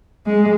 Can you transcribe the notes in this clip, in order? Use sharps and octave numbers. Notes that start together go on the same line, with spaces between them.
G#3